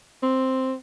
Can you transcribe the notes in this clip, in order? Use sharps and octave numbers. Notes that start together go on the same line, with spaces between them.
C4